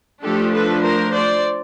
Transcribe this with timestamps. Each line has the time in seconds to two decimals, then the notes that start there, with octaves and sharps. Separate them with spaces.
0.22 F3 A3 D4 G4 A4
0.53 A4 B4
0.83 A#4 C5
1.12 C5 D5